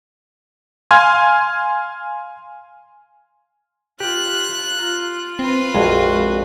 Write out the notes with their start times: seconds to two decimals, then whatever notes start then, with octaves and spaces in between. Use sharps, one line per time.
0.91 F5 G#5 C6 F6 G#6
4.00 F4 G4 F#6
4.79 F4 A#5
5.39 C4 F4 B4
5.75 A#1 F2 G#3 F#4